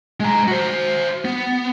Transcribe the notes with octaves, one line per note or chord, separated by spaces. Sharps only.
G#3 A#5
F#4 C5
B3